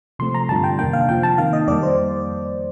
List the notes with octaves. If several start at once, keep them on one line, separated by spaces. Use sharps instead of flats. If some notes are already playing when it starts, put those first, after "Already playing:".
C3 F3 A3 C4 C6
A#5
G2 D3 G3 D4 F4 A5
G5
F2 C3 D#3 A#3 D4 G5
F5
C3 F3 C4 F4 G5
A5
D#3 A#3 D#4 F5
D#5
F2 D#3 G3 A#3 D5
C5